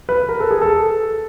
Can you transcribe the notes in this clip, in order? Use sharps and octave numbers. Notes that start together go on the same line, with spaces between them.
B4
A#4
A4
G#4
A4